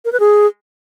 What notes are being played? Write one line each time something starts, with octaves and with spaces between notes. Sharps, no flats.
A#4
B4
G#4